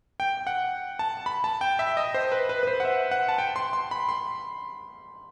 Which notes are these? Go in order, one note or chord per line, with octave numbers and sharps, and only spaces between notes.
G5
F#5
A5
B5
A5
G5
E5
D#5
C5
B4
B4
B4
C5
F#5
E5
F#5
A5
G5
C6
C6
B5
C6